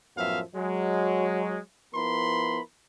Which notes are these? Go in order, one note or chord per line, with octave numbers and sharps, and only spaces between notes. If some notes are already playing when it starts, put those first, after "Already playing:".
F#2 A2 F3 B3 E5 F5
F#3 G#3
F3 B3 E4 A#4 B5 C6